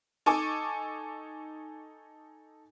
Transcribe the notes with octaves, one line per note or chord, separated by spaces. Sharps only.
D#4 A4 G#5 C#6 D6